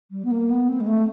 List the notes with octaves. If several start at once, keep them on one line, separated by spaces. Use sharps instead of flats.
G3
B3
A#3
B3
C4
G#3
A3